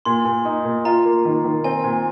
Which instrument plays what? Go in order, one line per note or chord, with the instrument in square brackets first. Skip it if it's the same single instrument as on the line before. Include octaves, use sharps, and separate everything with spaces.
[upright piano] A#2 [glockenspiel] C6
[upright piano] A#2
D#4
A#2
[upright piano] F4 [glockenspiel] A#5
[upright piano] A#3
D#3
D#3
[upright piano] C4 [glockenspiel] G#5
[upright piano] A#2